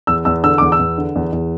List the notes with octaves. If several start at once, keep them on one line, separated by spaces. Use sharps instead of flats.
E2 E6
E2 E6
D3 E6
E2 D6
E6
E2
D3
E2
E2